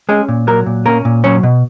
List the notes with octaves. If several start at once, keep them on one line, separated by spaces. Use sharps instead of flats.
G#3 C#4 G#4
A#2
F#3 A#3 A#4
A#2
A#3 C#4 A#4
A#2
F#3 C#4 C#5
B2